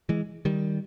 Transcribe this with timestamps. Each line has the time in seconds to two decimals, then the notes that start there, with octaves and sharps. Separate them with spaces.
0.09 E3 G#3
0.45 D#3 G3